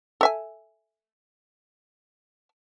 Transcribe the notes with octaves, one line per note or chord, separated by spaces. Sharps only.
A4 E5 G#5